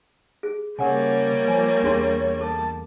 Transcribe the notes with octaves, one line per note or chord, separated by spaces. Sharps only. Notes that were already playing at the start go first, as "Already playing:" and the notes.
G#4
C#3 G3 A#3 A#4 C#5 F#5 G#5
F3 G#5
E2 D4 G#4 C6
A4 A5 D6